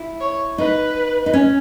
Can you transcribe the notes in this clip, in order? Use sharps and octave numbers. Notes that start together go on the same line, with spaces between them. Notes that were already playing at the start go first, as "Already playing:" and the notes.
Already playing: E4
C#5
D#4 B4
D#4
C#4